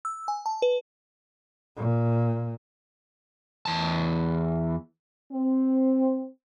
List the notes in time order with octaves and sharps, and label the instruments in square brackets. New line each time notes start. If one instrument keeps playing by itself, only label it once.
[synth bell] E6
G#5
A5
B4
[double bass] A#2
[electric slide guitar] E2 A5
[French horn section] C4